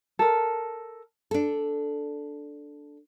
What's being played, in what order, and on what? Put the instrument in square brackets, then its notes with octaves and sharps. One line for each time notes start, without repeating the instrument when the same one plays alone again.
[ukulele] A4 A#4
[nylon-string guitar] D4 A4